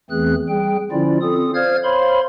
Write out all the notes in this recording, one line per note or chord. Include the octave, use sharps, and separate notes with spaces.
E2 E3 A3 C4 G#4 F#6
G3 G#4 G5
D3 F3 C#4 E4 F4 D5
C4 F4 A4 D#6
C5 D5 F5 F6 G#6
C5 C#5 F5 B5 C6